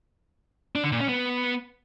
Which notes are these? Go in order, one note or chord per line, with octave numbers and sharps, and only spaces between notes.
D4
D3
A#2
C#4
B3